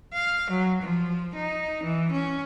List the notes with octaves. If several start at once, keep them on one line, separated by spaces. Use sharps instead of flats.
F5
F#3
F3
D#4
E3
C#4